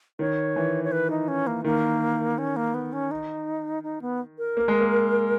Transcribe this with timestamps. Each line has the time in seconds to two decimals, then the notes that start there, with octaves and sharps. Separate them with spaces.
0.19 D#3 C#5
0.56 E3
0.84 C#5
0.92 B4
1.10 D#4
1.28 C#4
1.47 A#3
1.64 D#3 A#3
2.38 C#4
2.56 A#3
2.74 B3
2.93 C#4
3.11 D#4
3.83 D#4
4.02 B3
4.38 A#4
4.57 A#3
4.68 G#3
4.80 A#3